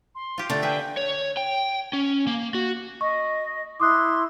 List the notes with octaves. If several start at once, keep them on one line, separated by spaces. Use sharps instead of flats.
C6
F4 G4
D3 A3 A6
G#4 B4 E5 G5
C#5
G5
C#4
A#3
F#4
D#5 C#6
E4 C6 D6 D#6 F#6